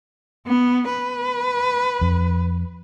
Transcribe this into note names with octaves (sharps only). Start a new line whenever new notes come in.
B3
B4
F2